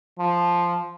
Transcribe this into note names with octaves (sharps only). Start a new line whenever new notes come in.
F3